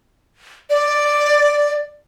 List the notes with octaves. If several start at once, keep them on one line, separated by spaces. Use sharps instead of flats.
D5